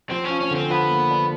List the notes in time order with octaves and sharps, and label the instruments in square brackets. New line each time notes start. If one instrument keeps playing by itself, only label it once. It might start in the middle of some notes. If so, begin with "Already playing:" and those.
[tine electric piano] F3 [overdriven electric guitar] C4
[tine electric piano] F3 [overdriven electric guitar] C#4
[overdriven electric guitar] C#4
[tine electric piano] D3 [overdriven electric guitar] C4
[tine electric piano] F3 [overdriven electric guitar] B3
[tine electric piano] A#3
D4